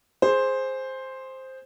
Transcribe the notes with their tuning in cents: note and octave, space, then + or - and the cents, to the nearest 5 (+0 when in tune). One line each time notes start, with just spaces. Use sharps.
G#4 +0 C5 +5